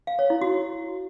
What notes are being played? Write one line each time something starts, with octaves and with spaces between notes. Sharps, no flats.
F5
C#5
E4
F#4